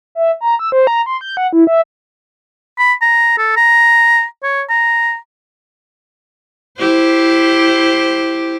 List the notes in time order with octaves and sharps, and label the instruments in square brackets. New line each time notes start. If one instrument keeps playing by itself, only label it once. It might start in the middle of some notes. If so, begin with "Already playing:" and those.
[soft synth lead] E5
A#5
E6
C5
A#5
C6
G6
F#5
E4
E5
[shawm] B5
A#5
A4
A#5
C#5
A#5
[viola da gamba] E4 G4 C5